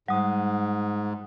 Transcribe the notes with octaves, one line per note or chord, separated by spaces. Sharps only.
G#2 G3 F#5 D#6